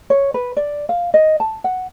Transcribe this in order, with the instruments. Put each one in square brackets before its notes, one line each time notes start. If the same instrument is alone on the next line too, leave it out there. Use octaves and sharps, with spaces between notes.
[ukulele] C#5
B4
D5
F5
D#5
A5
F#5